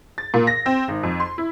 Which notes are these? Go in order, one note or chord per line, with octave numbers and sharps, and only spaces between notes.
A6
A#2
A#6
C4
G#1
F2
C6
E4